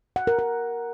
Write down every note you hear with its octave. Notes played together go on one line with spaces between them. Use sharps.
F#5
A#4
A#4